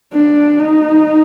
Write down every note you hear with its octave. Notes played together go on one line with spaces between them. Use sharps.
D4
D#4